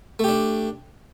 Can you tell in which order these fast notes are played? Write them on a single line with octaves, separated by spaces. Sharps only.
A3 G4 D4